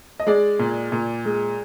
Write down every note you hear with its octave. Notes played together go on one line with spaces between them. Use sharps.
D#5
G#3 D5
A#2
A#2
G#3